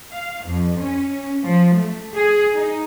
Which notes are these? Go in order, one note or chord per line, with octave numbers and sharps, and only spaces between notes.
F5
F2
C#4
F3
A3
G#4
D#4